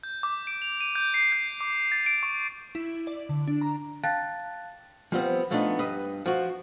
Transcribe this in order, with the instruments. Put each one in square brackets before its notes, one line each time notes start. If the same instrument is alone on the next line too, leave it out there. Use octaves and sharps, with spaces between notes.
[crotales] G6
D6
D7
F7
D#7
G6
C7
G6
D6
A6
D7
C#6
[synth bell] E4
D5
D3
D4
A#5
[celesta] F5 G5 A5 F#6 A6
[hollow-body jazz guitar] F3 G3 B3 C4
F3 A3 B3 D4 D#4
G2 B4 D#5
F3 F#4